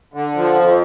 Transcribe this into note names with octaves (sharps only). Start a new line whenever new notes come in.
D3
F3
F2